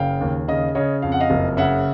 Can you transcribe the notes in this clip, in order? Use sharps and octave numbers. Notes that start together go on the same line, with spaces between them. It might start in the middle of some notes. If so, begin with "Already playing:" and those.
Already playing: F#1 C#3 F5 G5
D#2
C#3 D#5 F5
C#3 C#5 D#5
F2 F5
F#5
D#5 F5
F#1
C#3 E5 F#5